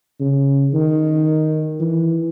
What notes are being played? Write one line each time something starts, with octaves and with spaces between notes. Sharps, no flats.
C#3
D#3
E3